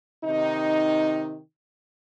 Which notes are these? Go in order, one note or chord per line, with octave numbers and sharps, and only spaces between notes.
C3 D#3 D#4